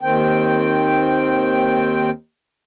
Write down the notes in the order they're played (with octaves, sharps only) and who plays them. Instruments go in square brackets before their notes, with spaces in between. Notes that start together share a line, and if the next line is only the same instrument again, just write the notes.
[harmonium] D#2 D#3 C4 G5